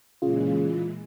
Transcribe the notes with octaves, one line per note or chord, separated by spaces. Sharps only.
A#2 C#3 E3 G#3 F4